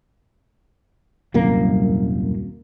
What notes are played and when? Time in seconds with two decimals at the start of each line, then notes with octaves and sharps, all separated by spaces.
1.34 D#1 C2 F#2 A#3